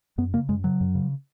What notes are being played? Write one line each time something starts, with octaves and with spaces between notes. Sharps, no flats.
F#2 B3
C#3 A#3
F#2 G#3
C#3 F#3
F#2
C#3